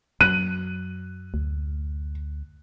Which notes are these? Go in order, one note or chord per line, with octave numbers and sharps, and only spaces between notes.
F#2 F#3 F#6 D#7
D2